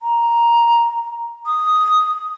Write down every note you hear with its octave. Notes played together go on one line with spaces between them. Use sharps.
A#5
D#6